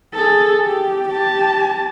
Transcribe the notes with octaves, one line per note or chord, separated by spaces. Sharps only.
G#4 A4
G4
G4 A5